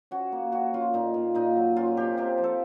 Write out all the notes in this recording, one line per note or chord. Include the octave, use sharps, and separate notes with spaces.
C#4 F#4
A#3
C#4 F#4
C#4 F4
A#2 D#4
A#2
A#2 D#4
F#3
C#4 F4
C3 G4
C3 G4
F3
A4